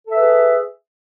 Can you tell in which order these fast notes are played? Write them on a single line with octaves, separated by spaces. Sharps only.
A4 E5 B4 G#4